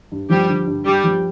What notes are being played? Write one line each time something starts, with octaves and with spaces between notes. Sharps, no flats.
G2
F3 G3 G4
D3
G2
G2 G3 G4
F3